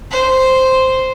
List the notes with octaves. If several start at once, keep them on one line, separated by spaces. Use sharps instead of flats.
C5